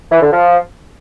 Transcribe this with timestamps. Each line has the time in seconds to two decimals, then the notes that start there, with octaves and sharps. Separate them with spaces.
0.11 E3
0.22 D3
0.32 F3